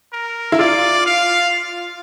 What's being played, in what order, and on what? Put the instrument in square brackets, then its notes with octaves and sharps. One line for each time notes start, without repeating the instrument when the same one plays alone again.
[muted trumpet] A#4
[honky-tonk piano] E4
[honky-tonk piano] F4 [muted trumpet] D5
[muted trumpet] F5